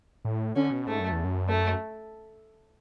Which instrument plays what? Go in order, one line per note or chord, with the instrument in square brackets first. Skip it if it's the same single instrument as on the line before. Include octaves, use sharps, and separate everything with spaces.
[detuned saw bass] A2
[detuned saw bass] D3 [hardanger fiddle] C#4
[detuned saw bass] B2
[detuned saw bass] G#2 [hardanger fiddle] A3
[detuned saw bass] F#2
E2
F#2
[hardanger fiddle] A3